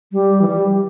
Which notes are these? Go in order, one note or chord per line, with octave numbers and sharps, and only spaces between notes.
G3
E3
G3